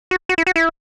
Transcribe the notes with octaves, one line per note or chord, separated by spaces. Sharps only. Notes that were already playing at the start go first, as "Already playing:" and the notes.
F#4
F#4
E4
F#4
E4